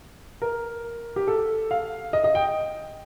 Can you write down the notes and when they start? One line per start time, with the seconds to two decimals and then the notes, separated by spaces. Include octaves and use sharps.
0.42 A#4
1.16 G4
1.28 A4
1.71 F5
2.13 D#5
2.24 D#5
2.35 G5